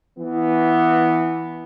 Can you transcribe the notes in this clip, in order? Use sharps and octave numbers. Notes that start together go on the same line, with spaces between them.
E3 B3